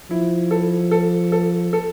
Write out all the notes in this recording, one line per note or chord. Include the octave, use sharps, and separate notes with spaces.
F3 E4
A4
A4
A4
A4